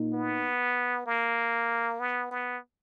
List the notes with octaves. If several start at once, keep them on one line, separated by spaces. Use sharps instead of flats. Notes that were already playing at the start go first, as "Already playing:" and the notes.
Already playing: A#2 A#3 D#4
B3
A#3
B3
B3